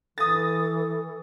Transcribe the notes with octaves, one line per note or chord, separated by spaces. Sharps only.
E3 A4 D#6 A6